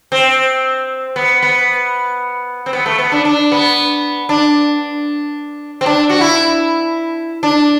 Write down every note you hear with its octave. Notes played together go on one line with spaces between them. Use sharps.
C4
B3
B3
C4
B3
A3
B3
D4
D4
B3
D4
C4
D4
F#4
E4
D4